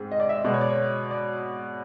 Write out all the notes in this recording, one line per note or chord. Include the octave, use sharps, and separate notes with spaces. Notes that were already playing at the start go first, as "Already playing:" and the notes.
Already playing: G#2 C4
D#5
D5
E5
D#5
B2 G#3 B3 D5
C#5
D5
C#5
D5